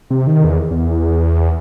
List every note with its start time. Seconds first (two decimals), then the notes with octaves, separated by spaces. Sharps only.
0.10 C3
0.27 D#3
0.44 E2
0.71 E2